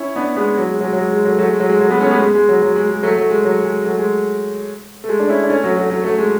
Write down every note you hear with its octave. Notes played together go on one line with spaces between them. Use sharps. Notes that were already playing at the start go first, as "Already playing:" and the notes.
Already playing: C#4 E4
B3 D4
G#3 B3
F#3
G#3
F#3
G#3
F#3
G#3
G#3
F#3 A3
F#3 A3
G#3
F#3
G#3
F#3 A3
G#3 B3
A3 C#4
G#3 B3
G#3
G#3
F#3
F#3
G#3
G#3
F#3 A3
F#3 A3
G#3
F#3
G#3
F#3 A3
G#3
A3
G#3
D4
C#4 E4
D4
A3 C#4
F#3 A3
F#3 A3
F#3 A3
F#3 A3
G#3